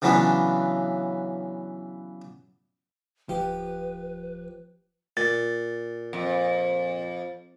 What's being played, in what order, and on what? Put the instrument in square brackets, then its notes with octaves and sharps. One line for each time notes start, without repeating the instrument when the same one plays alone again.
[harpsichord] C#3 E3 F#3 B3 D4
[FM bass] D1 [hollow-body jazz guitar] F3 [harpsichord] G4 [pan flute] B4
[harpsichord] A#2 [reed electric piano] A6
[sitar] F2